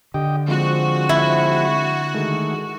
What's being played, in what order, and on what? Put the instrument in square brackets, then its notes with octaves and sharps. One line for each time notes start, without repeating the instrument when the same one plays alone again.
[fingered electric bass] D3 [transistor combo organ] G4 D#5 G5
[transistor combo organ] F3 G#3 C4 [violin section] F#4
[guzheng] E4
[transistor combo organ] D#3 G#3 A3